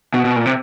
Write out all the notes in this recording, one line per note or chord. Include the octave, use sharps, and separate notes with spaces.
B2
B2
A#2
C3